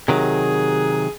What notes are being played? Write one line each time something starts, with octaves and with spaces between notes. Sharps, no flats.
C3 D#3 F#3 G#4